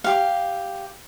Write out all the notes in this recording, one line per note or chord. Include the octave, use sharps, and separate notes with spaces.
G4 F5